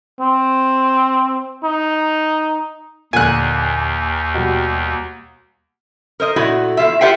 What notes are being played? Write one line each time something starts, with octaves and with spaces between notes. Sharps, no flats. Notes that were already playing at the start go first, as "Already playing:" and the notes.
C4
D#4
D#2 A#2 D3 A#3 G#5 F#6
B2 G3
A#4 C5 D#5
A#2 A3 E4 F#4
E2 F3 F4 E5
F4 G4 C5 E5 F#5 G5